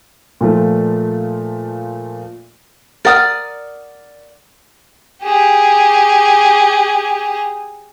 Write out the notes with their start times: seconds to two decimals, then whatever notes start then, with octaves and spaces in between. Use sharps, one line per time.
0.41 A#2 F3 A3
3.05 A#4 D5 F#5 D#6 F6
5.23 G4 G#4